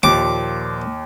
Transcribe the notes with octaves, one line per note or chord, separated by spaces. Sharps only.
D#2 A#2 F3 D6